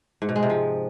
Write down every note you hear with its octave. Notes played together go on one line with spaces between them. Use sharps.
G#2
B2
G#3
C3
F3